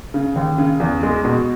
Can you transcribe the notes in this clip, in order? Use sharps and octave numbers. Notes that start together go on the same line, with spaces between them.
C#3
D#2
C#3
E2
G#3
B2